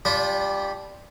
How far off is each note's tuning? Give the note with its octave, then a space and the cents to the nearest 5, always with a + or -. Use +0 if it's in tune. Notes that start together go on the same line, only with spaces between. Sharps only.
G3 +5 D4 -35 F4 +0